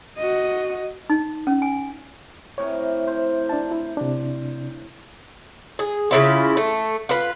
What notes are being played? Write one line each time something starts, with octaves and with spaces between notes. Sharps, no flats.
F#4 D#5
D#4
C#4
G#5
A2 C3 A#4 C#5
C5
D4 A5
E4
C3 D4
G#4
C#3 E4 F4
A3
F4 B4